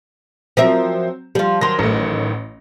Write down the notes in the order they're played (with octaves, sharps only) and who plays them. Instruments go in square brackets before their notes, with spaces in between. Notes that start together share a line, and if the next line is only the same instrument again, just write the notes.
[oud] F3 A#4 E5 [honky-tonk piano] F#3 C4
[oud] F3 F4 [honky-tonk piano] G3
[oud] D#3 F#3 [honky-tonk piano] C6 A#6
[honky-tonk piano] A1 A3